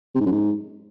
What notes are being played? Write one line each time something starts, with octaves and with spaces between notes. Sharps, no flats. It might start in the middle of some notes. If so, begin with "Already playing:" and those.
C3
G#2
F#2
G#2